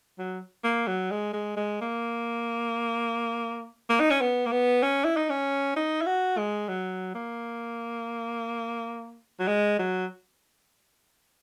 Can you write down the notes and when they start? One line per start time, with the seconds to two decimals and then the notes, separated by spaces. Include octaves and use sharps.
0.18 F#3
0.64 A#3
0.87 F#3
1.11 G#3
1.33 G#3
1.57 G#3
1.81 A#3
3.90 A#3
4.00 D#4
4.10 C#4
4.21 B3
4.46 A#3
4.52 B3
4.83 C#4
5.04 E4
5.16 D#4
5.29 C#4
5.76 D#4
6.01 E4
6.06 F#4
6.38 G#3
6.68 F#3
7.15 A#3
9.40 F#3
9.47 G#3
9.79 F#3